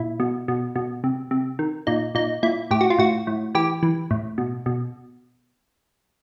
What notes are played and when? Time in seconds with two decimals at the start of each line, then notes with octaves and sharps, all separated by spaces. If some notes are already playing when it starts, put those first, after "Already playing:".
Already playing: A#2 E4
0.20 B2
0.48 B2
0.76 B2
1.04 C3
1.31 C3
1.59 D#3
1.87 A#2 D#4
2.15 A#2 D#4
2.43 A#2 E4
2.71 A2 G4
2.81 F#4
2.90 F4
2.98 A2 F#4
3.27 A2
3.55 E3 G4
3.83 E3
4.11 A2
4.38 B2
4.66 B2